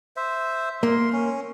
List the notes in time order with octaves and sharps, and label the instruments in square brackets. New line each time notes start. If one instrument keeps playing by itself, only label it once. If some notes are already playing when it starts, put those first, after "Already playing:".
[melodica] C5 E5
[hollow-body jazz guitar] A#3 [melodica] C6
[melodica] C#4